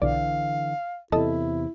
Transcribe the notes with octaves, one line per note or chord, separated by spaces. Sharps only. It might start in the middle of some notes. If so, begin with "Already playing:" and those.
B1 D3 E3 D5 F5
E2 C3 E4 A4 D#5 A5